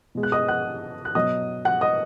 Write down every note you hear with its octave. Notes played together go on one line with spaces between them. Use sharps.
B2 G#3
F#6
D#5 D#6
F#5 F#6
F#6
B2 F#3 D#5 D#6
F#5 F#6
D#5 D#6